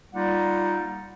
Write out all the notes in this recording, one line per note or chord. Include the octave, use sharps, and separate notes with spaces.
G3 A#3 D#4 F4 D5 F#5